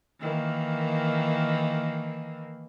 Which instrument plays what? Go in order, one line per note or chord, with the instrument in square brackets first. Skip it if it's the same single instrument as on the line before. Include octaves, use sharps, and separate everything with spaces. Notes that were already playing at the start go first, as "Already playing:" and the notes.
[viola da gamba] D#3 E3 A#3